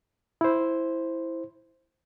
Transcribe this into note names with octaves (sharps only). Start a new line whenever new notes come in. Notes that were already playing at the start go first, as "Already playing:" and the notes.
E4 C5